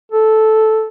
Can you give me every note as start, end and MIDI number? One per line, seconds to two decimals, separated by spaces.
0.12 0.88 69